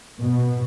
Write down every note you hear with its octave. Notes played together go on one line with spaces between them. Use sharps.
B2